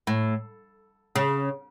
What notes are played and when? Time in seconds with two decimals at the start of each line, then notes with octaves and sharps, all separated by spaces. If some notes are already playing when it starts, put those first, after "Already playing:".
0.07 A2
1.16 C#3